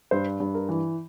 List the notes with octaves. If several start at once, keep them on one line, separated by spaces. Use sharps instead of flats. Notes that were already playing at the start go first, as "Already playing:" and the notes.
G2 C5
G2
A#4
E3